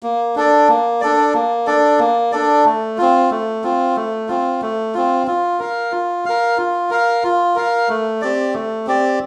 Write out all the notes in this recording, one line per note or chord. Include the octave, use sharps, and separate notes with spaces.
A#3
D4 A4 D5
A#3
D4 A4 D5
A#3
D4 A4 D5
A#3
D4 A4 D5
A3
C4 F4
A3
C4 F4
A3
C4 F4
A3
C4 F4
F4
A#4 F5
F4
A#4 F5
F4
A#4 F5
F4
A#4 F5
A3
C4 G4 D5
A3
C4 G4 D5